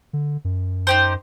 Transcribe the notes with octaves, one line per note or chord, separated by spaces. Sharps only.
D3
F#2
D#4 G4 C5